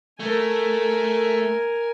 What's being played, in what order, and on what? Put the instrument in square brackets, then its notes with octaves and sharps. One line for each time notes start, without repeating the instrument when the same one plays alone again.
[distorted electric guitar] A3 [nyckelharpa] A#4 G#5